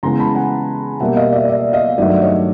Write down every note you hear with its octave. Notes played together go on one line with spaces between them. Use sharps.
C#3 E3 G#3 B3 A#5 C6
A5 B5
F#5 G#5
B2 G3 A#3 E5 F#5
D#5 F5
D5 E5
D5 E5
D#5 F5
G2 D#3 F#3 A3 D5 E5
C#5 D#5